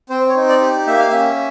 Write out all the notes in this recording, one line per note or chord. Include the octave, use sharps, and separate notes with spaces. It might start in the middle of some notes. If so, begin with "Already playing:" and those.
C4 C5
C#5
D#4
D5
G4
A#3 E5
F5
C#4 E5